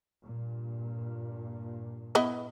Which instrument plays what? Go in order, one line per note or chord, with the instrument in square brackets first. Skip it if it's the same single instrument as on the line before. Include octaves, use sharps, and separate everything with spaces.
[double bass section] G2 A#2
[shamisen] B3 E4 D#5